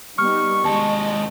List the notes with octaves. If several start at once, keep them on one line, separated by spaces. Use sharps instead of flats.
G3 B3 D#4 C#6 F6
D#2 G#3 D#5 A5